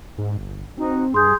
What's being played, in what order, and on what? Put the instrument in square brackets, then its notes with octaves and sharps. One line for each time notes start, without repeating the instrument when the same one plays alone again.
[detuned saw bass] G#2
G1
[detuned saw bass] C4 [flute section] D#4 F#4
[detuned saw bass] G2 [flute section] G#4 [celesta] C6 G6